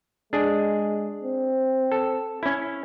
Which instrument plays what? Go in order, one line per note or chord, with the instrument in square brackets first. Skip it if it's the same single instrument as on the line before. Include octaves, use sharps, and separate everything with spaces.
[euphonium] G#3 [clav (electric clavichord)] D4 G#4
[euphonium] C4
[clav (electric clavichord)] A4
C#4 E4